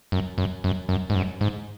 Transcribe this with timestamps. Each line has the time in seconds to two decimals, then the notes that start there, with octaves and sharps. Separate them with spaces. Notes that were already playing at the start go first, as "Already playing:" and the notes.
0.12 F#2
0.38 F#2
0.64 F#2
0.89 F#2
1.10 G#2
1.15 F#2
1.41 G#2